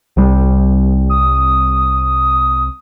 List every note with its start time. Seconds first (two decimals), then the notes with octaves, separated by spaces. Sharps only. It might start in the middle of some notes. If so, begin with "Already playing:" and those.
0.17 C2 G3
1.10 D#6